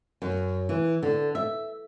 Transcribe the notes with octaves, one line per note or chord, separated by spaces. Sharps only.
F#2
E3
D3
E5